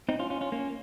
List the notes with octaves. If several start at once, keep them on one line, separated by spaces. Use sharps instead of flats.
C4 D#4
C#4 F4
C#4 F4
C#4 F4
A#3 C#4